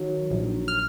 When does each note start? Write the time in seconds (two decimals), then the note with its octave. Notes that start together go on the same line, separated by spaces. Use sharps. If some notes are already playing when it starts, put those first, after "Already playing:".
Already playing: D#3 F#3
0.31 A#1
0.68 F6